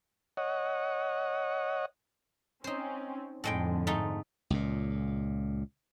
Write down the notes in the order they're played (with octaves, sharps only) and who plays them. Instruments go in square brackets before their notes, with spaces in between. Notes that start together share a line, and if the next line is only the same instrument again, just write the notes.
[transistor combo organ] C#5 D#5 F#5
[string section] C4 C#4 [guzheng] D#4 C5
[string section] F2 D3 [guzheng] A2 G#3 G5
[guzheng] G#2 A3 D#4
[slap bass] C#2 A#2